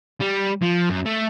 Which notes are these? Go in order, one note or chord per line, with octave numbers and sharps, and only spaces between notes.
G3
F3
F#2
A3